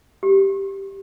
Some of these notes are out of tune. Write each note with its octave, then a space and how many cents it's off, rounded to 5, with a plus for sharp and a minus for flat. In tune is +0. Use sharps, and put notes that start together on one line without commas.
G4 -10